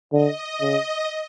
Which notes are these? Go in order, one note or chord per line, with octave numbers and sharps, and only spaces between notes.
D3 D#5
C#3